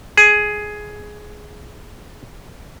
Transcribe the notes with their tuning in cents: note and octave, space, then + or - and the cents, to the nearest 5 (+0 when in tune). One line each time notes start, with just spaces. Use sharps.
G#4 +10